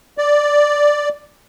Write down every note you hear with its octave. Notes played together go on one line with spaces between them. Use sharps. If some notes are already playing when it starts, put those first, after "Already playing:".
D5